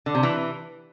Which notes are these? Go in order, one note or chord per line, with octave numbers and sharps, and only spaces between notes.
D3
C3
E3